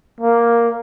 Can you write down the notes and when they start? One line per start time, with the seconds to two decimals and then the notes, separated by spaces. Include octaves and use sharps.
0.20 A#3